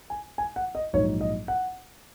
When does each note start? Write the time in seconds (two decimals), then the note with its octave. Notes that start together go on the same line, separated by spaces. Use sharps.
0.10 G#5
0.38 G#5
0.56 F#5
0.75 D#5
0.93 A#1 G#2 F#3 D#4 C#5
1.21 D#5
1.48 F#5